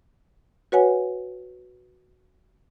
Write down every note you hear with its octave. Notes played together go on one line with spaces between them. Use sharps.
F#4 B4 C#5 F#5 G#5